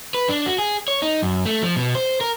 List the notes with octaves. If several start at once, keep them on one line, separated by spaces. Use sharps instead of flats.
B4
D4
F#4
G#4
C#5
D#4
F#2
A3
F3
B2
C5
A#4